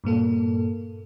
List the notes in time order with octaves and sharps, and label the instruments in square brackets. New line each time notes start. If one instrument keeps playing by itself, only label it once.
[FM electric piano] G2 A#2 A#3 A4